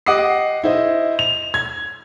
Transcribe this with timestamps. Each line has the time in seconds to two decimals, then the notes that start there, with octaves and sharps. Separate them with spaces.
0.06 G4 D#5 F#5 D6 D#6 C7
0.64 E4 C5 D#5
1.19 F7
1.54 G#6